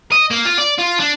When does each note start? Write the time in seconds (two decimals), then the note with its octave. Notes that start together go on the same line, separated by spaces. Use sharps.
0.12 D#5
0.31 A#3
0.45 F4
0.58 D5
0.78 F4
1.00 D4